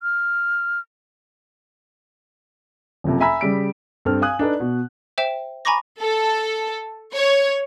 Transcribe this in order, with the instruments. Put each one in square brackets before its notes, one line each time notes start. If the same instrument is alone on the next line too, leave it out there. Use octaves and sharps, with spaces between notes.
[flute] F6
[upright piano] F#1 F2 C3
E5 G#5 A#5 B5 E6 B6
C#3 G3 D7
[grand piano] G2 C4 A4 F6
F5 G#5 D#6 F#6
D4 D#4 A4 B4 D5
B2
[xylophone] C5 E5 G5 E7
G#5 A#5 B5 C#6 D6 A#6
[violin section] A4
C#5